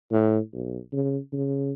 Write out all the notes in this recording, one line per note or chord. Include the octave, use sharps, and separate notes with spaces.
A2
B1
C#3
C#3